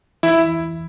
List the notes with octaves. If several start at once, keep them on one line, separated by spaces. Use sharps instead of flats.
E3 E4